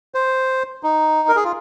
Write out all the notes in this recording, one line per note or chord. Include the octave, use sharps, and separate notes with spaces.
C5
D#4
A#4
G#4
F4